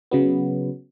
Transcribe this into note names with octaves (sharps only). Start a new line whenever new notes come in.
C#3 F#3 B3